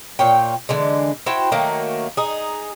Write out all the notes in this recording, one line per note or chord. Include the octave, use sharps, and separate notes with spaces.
A#2 C#5 G5
D3 E3 G#3
E4 F#4 C5 G5
D#3 F#3 A3 A#3
D#4 G#4